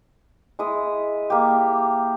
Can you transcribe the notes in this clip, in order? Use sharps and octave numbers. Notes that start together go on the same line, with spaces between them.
G#3 E4 D#6
A#3 G4